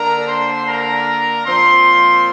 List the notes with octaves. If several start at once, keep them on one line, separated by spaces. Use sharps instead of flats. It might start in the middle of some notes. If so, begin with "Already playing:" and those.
Already playing: D3 A#3 D4 A#4 A#5
C5 C6
A#4 A#5
A#2 F3 C4 C5 C6